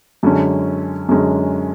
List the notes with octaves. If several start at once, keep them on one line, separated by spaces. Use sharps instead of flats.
F#2 D3 G#3 C#4
F#2 D3 G#3 C#4